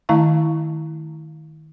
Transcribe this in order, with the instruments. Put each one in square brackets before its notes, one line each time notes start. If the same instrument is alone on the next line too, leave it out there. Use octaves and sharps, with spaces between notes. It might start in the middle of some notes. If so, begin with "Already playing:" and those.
[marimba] D#3 A3 E4 F5 A#5 C#6